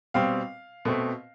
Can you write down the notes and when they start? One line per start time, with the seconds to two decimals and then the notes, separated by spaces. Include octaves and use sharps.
0.14 B2 G3 C4 F5
0.85 B2 A3 C4